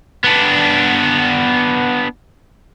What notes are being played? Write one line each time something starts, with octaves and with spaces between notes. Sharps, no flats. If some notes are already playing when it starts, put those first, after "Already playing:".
B3 D4